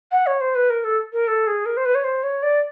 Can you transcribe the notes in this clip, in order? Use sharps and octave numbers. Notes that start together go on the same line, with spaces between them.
F#5
C#5
C5
B4
A#4
A4
A#4
A4
G#4
A#4
C5
B4
C#5
C5
C#5
D5